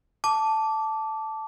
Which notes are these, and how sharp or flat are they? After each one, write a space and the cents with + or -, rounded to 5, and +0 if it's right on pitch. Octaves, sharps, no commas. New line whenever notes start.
A5 +0 D6 -15